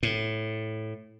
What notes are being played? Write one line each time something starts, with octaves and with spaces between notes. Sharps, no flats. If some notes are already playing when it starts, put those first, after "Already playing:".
A2